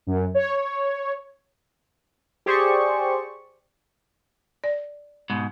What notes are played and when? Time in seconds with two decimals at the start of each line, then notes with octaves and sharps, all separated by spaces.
0.07 F#2
0.34 C#5
2.46 G4 G#4 C5 D5 C#6
4.64 D5
5.30 G#2 B2